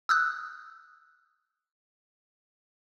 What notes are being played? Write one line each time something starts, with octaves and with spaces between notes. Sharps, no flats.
D#6 E6 F#6